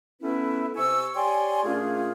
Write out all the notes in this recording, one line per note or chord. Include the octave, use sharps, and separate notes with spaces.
A3 B3 C#4 E4 B4
C3 G#5 C#6 E6
G4 C#5 D5 G5 G#5 C6
A#2 A3 C#4 D4 F4 G#4